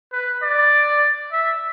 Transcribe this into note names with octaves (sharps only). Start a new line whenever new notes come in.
B4
D5
E5